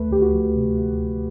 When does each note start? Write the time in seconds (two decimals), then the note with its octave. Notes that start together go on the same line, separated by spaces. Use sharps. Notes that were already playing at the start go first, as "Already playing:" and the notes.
Already playing: D#2 A3 B4
0.11 D2 G4
0.22 F#4
0.33 F3
0.55 C3
0.78 A3
1.00 D2